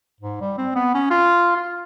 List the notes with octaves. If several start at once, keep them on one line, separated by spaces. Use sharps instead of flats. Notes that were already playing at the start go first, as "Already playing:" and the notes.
G#2
G3
C4
B3
C#4
F4
F4